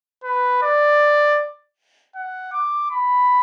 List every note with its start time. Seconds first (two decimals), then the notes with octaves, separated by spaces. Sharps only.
0.24 B4
0.63 D5
2.15 F#5
2.53 D6
2.91 B5